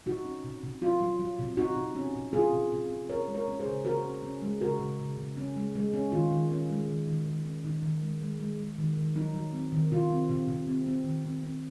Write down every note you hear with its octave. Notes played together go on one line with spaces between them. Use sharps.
C3 D#4 F#4
C#4
C3
C3
F#3 F4
F#3
F#3
C3
C3 D#4 F#4
C3
C#4
C3
C3 F4 G#4
C3
C3
C3
C#4 A#4 C#5
G#3
A#4 C#5
C#4
G#4 C5
C#3
C#3 F#4 A#4
C#4
C#4
G#3
C#3 F#4 A#4
C#3
C#3
C#3
C#4
G#3
G#3
C#4
D#3 F4
D#3
C#4
G#3
D#3
D#3
D#3
C#4
D#3 D#4
D#3
G#3
G#3
G#3
G#3
D#3
D#3
F#3 D#4
F#3
C4
D#3
C3 F4
C4
C3
C3
C4
C4
D#3
C4
C4